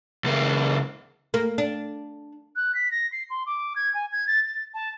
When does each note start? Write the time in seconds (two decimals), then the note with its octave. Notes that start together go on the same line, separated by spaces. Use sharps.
0.24 C#2 A#3
1.34 A#3
1.58 D4
2.56 F#6
2.75 B6
2.91 A#6
3.12 C7
3.30 C6
3.46 D6
3.76 G#6
3.94 G#5
4.12 G#6
4.27 A6
4.46 A6
4.74 A5